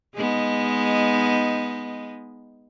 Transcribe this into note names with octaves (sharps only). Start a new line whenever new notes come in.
G#3 B3 D#4